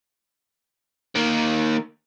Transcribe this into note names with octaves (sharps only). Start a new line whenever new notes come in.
D#3 A#3